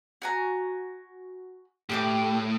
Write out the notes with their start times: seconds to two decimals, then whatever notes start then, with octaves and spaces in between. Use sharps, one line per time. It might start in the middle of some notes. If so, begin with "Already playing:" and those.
0.22 F#4 G#5 A#5
1.90 A2 G4 G5 D6